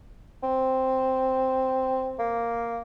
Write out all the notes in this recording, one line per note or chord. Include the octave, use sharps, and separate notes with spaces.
C4
A#3